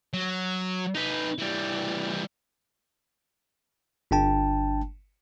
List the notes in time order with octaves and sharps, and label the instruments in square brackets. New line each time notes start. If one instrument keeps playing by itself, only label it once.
[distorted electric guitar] F#3
D#4 B4
E3 G3
[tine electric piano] G1 D4 G5 A5